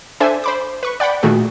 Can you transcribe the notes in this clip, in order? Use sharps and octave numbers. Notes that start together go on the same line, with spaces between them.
D4 A4 C5 E5 G#5
C5 B5 D6
B4 C#6
D5 F#5 G5 B5
A#2 D#3 A3 F#4 G#4